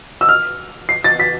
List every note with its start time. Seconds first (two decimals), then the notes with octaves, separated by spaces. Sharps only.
0.21 E6
0.29 F6
0.89 C7
1.04 A6
1.20 B6